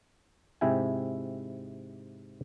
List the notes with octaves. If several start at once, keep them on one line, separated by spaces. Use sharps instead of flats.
G#2 C3 E4 E5 G5 G#5